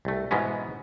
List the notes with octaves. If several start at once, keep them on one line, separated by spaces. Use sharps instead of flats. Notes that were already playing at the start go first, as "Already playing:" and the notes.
C2 A3
G#2 B2 E3 G#3 B3 C#4